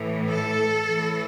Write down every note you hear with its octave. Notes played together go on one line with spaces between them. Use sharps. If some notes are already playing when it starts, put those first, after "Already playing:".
Already playing: A2 E3
A4
A2 E3